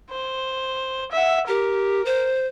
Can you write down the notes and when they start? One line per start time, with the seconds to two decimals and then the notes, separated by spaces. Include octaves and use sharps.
0.11 C5
1.11 E5 F#5
1.48 G4 A#4
2.05 C5